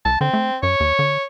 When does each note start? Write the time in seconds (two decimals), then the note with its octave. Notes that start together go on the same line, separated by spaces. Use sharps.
0.05 C2 A5
0.21 D3 C4
0.33 A3
0.63 F#2 C#5
0.80 D#2
0.99 D3